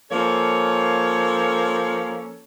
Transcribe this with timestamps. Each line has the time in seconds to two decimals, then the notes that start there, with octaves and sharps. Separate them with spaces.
0.11 F3 A#3 C#4 A4 C#5